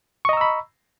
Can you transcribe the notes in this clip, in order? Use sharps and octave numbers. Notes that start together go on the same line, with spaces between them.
D#5 A#5 B5 C#6 E6